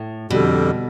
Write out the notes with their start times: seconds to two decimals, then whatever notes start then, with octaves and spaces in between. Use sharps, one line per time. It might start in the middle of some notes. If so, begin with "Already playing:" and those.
Already playing: A2
0.30 F2 B2 D3 G3